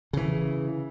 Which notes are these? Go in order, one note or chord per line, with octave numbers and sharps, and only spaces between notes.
C#3 E3